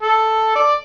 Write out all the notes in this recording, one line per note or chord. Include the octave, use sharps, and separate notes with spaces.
A4
D5